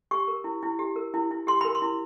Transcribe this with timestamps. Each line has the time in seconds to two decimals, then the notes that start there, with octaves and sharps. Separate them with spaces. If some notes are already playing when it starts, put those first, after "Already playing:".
0.11 G4 C#6
0.28 A#4
0.44 E4
0.63 E4
0.79 G4
0.96 A#4
1.14 E4
1.31 E4
1.47 G4 C6
1.61 A#4 B5
1.75 C6
1.82 E4